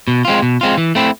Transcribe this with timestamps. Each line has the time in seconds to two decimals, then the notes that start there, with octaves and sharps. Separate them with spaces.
0.08 B2
0.25 G#3 C4 F4
0.42 B2
0.61 G#3 C4 F4
0.78 E3
0.95 A3 C4 E4